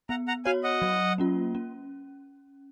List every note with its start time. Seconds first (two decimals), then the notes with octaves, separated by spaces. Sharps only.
0.09 B3 F#5 A#5
0.28 F#5 A#5
0.45 F#4 C#5 F5 G#5
0.63 D#5 F#5
0.82 F#3
1.18 A#3 C#4 F4
1.55 C#4